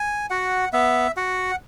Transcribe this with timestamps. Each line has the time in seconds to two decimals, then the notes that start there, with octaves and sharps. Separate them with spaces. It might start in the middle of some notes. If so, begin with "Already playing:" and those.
Already playing: G#5
0.30 F#4 F#5
0.73 B3 E5
1.17 F#4 F#5